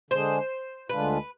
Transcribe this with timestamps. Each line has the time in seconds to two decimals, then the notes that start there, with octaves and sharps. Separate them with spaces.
0.11 D3 G#3 D4 G#4 C5
0.90 D2 D3 G#3 D4 F4 B4